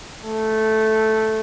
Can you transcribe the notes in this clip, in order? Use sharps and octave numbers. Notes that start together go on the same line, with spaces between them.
A3